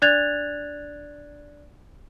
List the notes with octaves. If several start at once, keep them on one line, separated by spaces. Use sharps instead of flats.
D4 D5 F#6 G#6 A6 F7